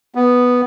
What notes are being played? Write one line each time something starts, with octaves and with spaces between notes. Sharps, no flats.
B3